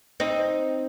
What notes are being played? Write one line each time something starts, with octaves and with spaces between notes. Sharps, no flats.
C4 D#4